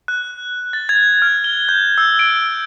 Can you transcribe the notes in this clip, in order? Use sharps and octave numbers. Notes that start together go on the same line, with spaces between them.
F#6
A6
G#6
F6
G7
G6
E6
D7